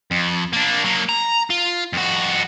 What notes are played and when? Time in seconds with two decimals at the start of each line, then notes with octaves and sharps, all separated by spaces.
0.11 F2
0.53 A#3 D4
0.84 F#3 A#3
1.09 A#5
1.50 F4
1.93 F2 F#4